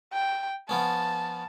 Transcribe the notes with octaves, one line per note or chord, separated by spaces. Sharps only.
G5
F3 B3 C#4 A5